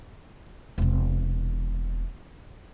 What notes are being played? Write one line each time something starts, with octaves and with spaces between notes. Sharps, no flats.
E1 C3